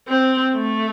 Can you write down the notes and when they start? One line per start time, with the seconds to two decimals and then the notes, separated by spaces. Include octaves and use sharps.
0.08 C4
0.55 A3